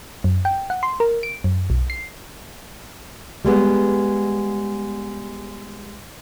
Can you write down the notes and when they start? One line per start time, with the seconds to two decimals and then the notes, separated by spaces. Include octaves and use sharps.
0.24 F#2
0.45 G5
0.70 F#5
0.83 C6
1.00 A#4
1.23 D7
1.44 F#2
1.70 B1
1.90 C7
3.45 G3 G#3 B3